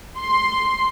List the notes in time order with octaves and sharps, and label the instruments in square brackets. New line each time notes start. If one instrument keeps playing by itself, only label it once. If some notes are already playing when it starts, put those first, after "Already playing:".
[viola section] C6